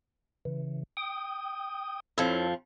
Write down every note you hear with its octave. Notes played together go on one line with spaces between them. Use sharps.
C#3 E3
G5 D#6
F2 F3 E4 A4 C#5